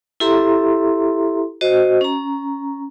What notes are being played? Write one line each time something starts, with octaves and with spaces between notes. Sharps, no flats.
E4 G4 A4 E5 A#5 C6
F#4 C5 D#5
C#4 A#5